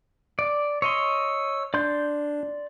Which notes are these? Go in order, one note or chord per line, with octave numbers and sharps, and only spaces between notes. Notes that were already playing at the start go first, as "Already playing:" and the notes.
D5
C#5 D#5 C6 E6
D4 D5 C6 G6